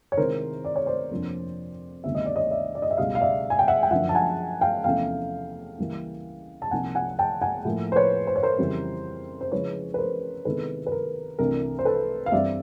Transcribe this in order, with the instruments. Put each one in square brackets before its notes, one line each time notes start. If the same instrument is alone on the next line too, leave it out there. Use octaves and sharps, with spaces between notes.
[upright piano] C#5
C3 D#3 G#3 C4 E4 A#4 C5
D5
C#5
C5 D5
F2 C3 F3 A#3 D4
D2 C3 D#3 G3 B3 E5
D#5
D5
C#5 D#5
D5 E5
D5
D#5
E5
C#2 B2 G3 D#5 F5
F5
D5 E5
G#5
G5
E5 F#5
G5
F#2 D3 F3 E5 F#5
A5
F#5 G#5
F5 G5
E2 C3 F3 A3 C#4 F5 G5
C#2 C#3 E3 G3 A#3
A5
C2 C3 F3 A#3 D#4 F#5 G#5
F#5 G#5
G5 A5
F#5 G#5
A2 F3 A#3
C5
B4 C#5
C5
C#5
A#4 C5
F2 C#3 E3 G3
C5
C#3 F3 G#3 C#4 E4 B4 C#5
B4
A#4 C5
C3 D#3 G#3 B3 E4 A4 B4
B4
A#4
C2 C3 E3 A3 D4 A#4
C5
A4 B4
F5
G2 E3 G3 C4 D5 E5